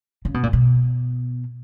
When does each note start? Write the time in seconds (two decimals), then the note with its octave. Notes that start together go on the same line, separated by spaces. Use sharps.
0.25 C#3
0.34 B2
0.43 A#2
0.53 B2